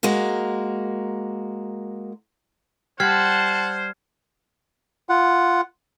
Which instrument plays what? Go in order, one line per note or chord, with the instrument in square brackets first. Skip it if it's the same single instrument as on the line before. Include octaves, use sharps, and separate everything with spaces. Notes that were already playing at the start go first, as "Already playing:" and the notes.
[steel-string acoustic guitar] G#3 A#3 F#4 A#4
[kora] G3 [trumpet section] C5 [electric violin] F#5 A5 [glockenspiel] F6 G#6 C7
[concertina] F4 F#5